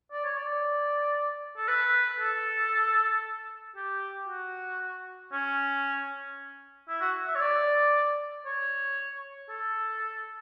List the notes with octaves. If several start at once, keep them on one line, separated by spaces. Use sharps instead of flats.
D5
C#5
D5
A4
B4
A4
G4
F#4
C#4
E4
F#4
E5
C#5
D5
C#5
A4